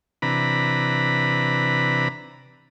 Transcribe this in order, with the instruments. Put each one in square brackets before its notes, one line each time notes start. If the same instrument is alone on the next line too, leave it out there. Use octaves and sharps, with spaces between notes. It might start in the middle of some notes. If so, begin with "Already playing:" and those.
[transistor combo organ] C3 E3 D4 B4 A#5 B5